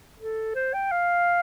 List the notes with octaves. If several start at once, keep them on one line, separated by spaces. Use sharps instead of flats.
A4
C5
G5
F5